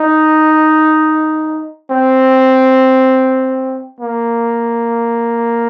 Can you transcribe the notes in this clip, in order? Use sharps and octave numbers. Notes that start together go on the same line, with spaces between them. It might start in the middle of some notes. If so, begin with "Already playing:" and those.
Already playing: D#4
C4
A#3